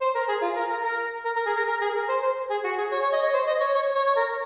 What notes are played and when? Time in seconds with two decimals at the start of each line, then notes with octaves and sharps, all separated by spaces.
0.01 C5
0.15 A#4
0.29 G#4
0.42 F4
0.56 A#4
0.70 A#4
0.84 A#4
1.25 A#4
1.36 A#4
1.46 G#4
1.57 A#4
1.67 A#4
1.81 G#4
1.95 A#4
2.09 C5
2.22 C5
2.50 G#4
2.64 F#4
2.78 G#4
2.92 C#5
3.02 C#5
3.13 D#5
3.22 C#5
3.34 C5
3.47 D#5
3.61 C#5
3.75 C#5
3.96 C#5
4.06 C#5
4.16 A#4